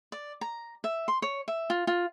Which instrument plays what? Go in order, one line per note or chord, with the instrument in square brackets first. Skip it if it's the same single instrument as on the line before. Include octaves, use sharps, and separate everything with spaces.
[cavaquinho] D5
A#5
E5
C6
C#5
E5
F4
F4